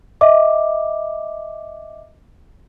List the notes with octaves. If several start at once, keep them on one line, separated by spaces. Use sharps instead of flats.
D#5 E5 D6